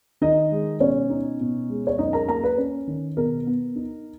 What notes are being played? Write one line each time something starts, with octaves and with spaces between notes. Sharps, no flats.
D#3 D#4 D#5
G#3
B2 C#4 C#5
D#4
B2
G#3
C#5
F#2 D#4 D#5
A#4 A#5
A#3 A#4 A#5
B4
C#4
D#3
B2 A#4
B3
D#4